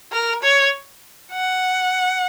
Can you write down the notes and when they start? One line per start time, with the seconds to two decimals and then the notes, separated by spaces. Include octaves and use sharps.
0.12 A#4
0.43 C#5
1.33 F#5